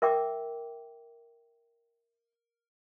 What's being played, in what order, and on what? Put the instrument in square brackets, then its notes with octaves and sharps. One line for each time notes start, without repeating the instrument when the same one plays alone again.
[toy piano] A#4 E5 G5 D6